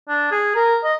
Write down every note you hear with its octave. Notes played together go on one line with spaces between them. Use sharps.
D4
G#4
A#4
D#5